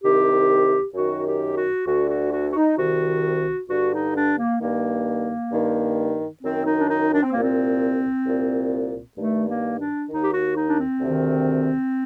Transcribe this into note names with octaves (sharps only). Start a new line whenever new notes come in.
C2 C3 D#3 G4
F#2 D#3 F#4
G4
F#4
D2 D3 F#4
F#4
F#4
F#4
D#4
C2 C3 D#3 F#4
G2 D3 F#4
D#4
D4
A#3
G2 D#3 A#3
G2 D#3
F#2 D#3 C4
D#4
D4
D#4
D4
C4
C2 A#2 A#3
C4
C2 A#2
G2 D#3 A3
A#3
D4
D#2 D#3 D#4
G4
F#4
D#4
D4
C4
D2 C3 D#3